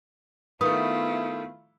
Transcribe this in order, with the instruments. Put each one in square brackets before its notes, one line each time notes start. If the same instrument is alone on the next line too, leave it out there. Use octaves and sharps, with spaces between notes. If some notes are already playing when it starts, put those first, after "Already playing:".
[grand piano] D#3 A3 [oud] B3 [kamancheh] E4 F4 [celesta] D#6